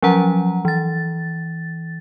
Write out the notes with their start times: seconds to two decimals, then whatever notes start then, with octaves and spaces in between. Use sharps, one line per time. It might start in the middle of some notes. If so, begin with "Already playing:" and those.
0.02 F3 F#3 C#4 F#5 A#5
0.65 E3 A6